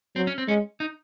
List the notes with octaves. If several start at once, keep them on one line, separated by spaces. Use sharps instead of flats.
F#3 C4
C#4
C4
G#3 C#4
D#4